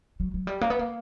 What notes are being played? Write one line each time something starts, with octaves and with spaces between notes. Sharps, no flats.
F#3
F#3
G3
A#3
B3
A#3